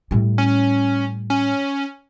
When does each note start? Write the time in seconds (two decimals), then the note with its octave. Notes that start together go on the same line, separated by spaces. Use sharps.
0.11 A2 G3
0.38 C#4
1.30 C#4